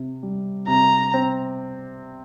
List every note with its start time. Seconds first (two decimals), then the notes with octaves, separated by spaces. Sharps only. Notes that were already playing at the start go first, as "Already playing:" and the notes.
Already playing: C3
0.23 G3
0.67 C3 A#5
1.14 C4